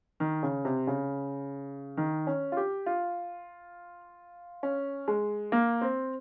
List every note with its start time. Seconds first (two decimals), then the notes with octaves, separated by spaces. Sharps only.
0.20 D#3
0.43 C#3
0.65 C3
0.87 C#3
1.97 D#3
2.27 C#4
2.52 F4
2.57 G4
2.86 F4
4.63 C#4
5.08 G#3
5.52 A#3
5.81 C4